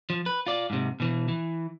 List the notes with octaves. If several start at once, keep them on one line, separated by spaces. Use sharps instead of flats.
F3
B4
F4 D5
G#2 C3
B2 E3
E3